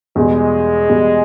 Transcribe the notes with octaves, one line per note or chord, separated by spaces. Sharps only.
E2 B2 G3 G#3
E2 B2 G3